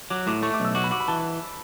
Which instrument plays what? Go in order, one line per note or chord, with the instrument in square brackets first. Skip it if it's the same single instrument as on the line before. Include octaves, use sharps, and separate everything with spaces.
[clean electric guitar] F#3 [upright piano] D6
[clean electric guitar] A2 [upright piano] D6
[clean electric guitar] A3 [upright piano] C#6
[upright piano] D6
[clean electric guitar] B1 [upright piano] E6
[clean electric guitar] F#4 [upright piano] D6
[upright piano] B5
[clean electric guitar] F#4 [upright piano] D6
[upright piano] B5
[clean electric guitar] E3 [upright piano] A5